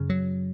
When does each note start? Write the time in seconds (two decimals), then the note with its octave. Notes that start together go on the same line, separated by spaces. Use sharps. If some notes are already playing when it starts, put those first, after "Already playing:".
Already playing: F#2 C#3
0.10 F#3